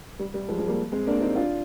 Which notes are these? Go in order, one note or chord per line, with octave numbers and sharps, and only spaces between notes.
G3
G3
F3 G#3
F3 G#3
G3 A#3
G#3 C4
A#3 D4
C4 D#4
D4 F4